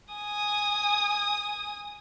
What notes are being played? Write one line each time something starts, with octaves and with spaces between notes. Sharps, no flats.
G#5 D#6